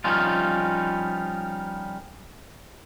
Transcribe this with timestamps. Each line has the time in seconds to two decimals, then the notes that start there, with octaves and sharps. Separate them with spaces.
0.04 F3 G3 C#4 D#4 F4